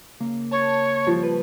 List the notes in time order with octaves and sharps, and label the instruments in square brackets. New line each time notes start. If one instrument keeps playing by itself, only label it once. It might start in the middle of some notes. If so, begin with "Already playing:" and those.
[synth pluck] C#3 A#3
[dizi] C#5 [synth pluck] A5
[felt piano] F3 [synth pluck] G3
[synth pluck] B4